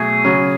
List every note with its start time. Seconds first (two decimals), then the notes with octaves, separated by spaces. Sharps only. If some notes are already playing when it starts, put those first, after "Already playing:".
Already playing: B2 F#3 A3 G#4
0.24 C#3 F#3 C#4